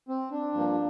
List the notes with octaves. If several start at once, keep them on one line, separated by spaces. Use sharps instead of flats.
C4
D4
G2 F3 A#3